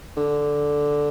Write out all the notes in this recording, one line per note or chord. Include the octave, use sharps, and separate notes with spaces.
D3